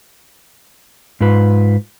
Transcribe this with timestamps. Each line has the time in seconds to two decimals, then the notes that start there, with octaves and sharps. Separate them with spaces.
1.21 G#2 F4 B4